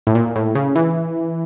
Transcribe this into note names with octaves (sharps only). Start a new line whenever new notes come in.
A2
A#2
A2
C#3
E3